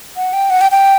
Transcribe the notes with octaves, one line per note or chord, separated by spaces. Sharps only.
F#5
G5
F#5
G5
G5